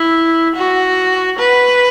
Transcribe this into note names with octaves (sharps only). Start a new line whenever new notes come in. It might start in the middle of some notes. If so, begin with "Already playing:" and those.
Already playing: E4
F#4
B4